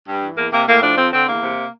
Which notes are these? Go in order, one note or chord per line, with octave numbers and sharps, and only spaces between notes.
G2
E3
E2 A#3
C3 A#3
A2 A#3
F3 D4
F2 C4
D3 C4
E2 A#3
C3